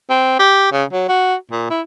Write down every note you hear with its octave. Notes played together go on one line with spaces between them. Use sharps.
C4
G4
C#3
F#3
F#4
A#2
E4